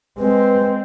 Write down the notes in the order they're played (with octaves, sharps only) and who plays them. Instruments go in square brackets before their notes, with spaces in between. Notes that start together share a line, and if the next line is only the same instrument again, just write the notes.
[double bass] G#3 [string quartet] C4 [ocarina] B4